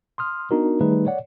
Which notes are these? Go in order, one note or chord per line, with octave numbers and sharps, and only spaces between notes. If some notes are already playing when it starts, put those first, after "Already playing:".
C6 D#6 F6
B3 D4 D#4 F#4 A#4
D#3 G3 A3 D#4 G#4 B4
C#5 D5 F#5